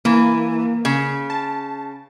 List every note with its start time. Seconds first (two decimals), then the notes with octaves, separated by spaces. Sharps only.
0.05 E3 A#3
0.85 C#3
1.30 A5